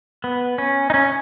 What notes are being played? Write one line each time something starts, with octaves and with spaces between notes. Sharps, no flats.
B3
C#4
D#4
C#4